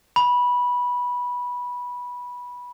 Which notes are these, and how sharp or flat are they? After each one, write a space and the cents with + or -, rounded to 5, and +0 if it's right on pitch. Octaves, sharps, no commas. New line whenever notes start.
B5 -15